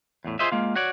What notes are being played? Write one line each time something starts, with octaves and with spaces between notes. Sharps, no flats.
E2 A2
F4 G#4 C5 D#5 E5
G#3 A#3 F4
F#4 C#5 D5